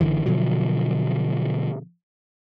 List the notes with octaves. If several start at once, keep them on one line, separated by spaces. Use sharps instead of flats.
F#1 C#2 D3 E3
B2 D3 F3 F#3